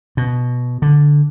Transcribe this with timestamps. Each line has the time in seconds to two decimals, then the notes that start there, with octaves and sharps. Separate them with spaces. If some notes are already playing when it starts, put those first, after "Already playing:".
0.17 B2
0.82 D3